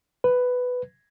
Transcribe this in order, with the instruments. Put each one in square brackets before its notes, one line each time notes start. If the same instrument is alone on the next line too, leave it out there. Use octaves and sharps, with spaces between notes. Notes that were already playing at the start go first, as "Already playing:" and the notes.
[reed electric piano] B4